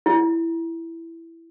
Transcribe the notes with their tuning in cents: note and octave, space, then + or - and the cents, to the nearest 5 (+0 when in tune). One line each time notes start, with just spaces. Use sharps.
E4 +5